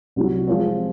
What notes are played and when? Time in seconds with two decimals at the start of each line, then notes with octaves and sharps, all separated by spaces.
0.16 C2 C3 F#3
0.47 F3 G#3 C4 F4 C5